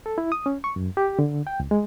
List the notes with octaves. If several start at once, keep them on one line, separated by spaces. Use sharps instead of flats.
A4
E4
D#6
C#4
C#6
F#2
G4
D3
G5
C#2
G#3